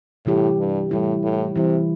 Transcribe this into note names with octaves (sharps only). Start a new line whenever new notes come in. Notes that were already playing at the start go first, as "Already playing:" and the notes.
A2 C3 E3 G3 E4 G4
G2
A2 E3 G3 E4
A2
C3 E3 G3 E4